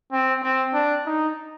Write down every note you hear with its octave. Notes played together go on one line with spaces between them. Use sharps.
C4
C4
D4
D#4